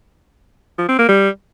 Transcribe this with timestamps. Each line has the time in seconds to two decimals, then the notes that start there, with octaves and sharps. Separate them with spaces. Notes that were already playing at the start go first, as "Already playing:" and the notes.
0.78 F3
0.88 C4
0.99 A#3
1.09 G3